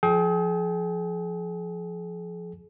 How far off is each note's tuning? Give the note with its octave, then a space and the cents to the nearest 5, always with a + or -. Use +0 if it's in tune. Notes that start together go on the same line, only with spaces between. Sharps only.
F3 +0 G#4 +40 G5 +0